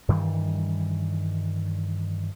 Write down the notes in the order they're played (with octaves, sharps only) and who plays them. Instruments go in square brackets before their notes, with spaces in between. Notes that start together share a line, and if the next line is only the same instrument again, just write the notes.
[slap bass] G2 D#3 E3 G3